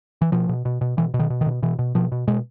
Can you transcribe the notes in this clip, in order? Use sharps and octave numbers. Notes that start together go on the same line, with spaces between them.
E3
B2 F3
B2
B2
B2
B2 E3
B2
D#3
B2
D#3
B2
B2 E3
B2
B2 F3
B2
B2 G#3